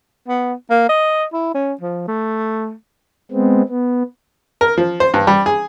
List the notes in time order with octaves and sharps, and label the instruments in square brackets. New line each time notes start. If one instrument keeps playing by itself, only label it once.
[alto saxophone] B3
A#3
D#5
E4
C#4
F3
A3
[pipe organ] G#3 B3 C4
B3
[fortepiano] A#4
F3
C5
G2
G3
G#4